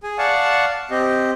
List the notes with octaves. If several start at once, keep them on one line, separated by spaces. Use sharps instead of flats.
G#4 G#5
D5 F5 F#5 A5 C#6
C4 G4 D#5